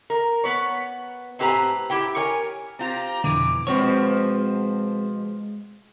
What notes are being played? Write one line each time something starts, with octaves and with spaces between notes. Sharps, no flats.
A#4
B3 B4 C#5
A2 C4 G4 B4 G#5 A#5
E4 G4 G5
A#4 C#5 G#5
C4 F4 G4 A#5
F2 B2 D3 E3 D6
B2 F3 G#3 C4 C#5